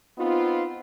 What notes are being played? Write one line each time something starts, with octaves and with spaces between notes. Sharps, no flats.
B3 C4 D#4 F4